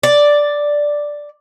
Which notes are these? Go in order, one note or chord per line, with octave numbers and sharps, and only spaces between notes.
D5